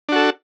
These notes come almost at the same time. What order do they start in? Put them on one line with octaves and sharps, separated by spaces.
D4 F#4 A4